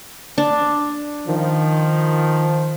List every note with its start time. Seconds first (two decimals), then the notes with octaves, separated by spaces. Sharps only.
0.38 D4
1.27 D#3 F3